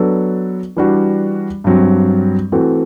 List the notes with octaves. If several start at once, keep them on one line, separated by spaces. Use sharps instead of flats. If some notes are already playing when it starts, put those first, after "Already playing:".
Already playing: F#3 B3 D4 A4
E3 G3 D4 F#4
G2 F#3 C4
E3 A3 C4 F#4